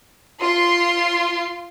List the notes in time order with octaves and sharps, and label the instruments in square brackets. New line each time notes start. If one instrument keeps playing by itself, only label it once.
[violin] F4 C6